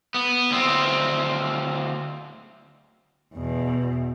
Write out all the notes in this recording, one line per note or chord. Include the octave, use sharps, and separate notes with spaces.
B3
D2 C4
E2 B2